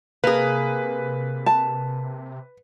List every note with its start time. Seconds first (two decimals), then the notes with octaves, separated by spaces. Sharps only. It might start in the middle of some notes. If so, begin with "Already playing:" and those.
0.24 C3 A#3 G#4 B4
1.46 A5